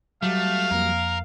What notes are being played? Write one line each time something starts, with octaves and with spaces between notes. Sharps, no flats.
F#3 G3 A3 F5
F2 A#3 A#4